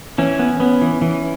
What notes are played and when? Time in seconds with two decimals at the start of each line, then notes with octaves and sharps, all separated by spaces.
0.18 E3 C#4
0.39 B3
0.60 B3
0.81 E3
1.02 E3